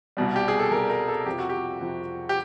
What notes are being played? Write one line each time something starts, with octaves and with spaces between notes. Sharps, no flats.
C2 B2 G3
G4
G#4
A4
C2 B2 G3 A#4
A#4
A4
F2 C3 F3 G4
F#4
G4
F2 C3 F3
G4